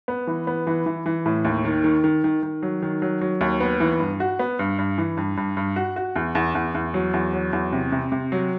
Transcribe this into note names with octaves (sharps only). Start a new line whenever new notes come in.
B3
E3
B3
E3
E3
E3
A2
D#2
D#3
D#3
D#3
D#3
D#3
F#3
D#3
F#3
F#3
D#2
B3
E3
G2
F#4
B3
G2
G2
E3
G2
G2
G2
F#4
F#4
E2
E2
E2
E2
F#3
E2
F#3
E2
C3
C3
C3
F#3